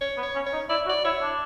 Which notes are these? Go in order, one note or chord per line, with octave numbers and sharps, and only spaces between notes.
C#5
B3
C#5
C#4
C#5
D#4
E4 D5
F#4
D5
E4 C#5
D4